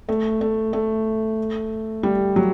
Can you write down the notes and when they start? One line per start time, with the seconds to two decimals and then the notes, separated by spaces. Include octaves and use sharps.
0.09 A3
0.41 A3
0.73 A3
2.03 G3
2.36 F#3